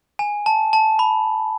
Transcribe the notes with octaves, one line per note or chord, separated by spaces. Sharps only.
G#5
A5
A5
B5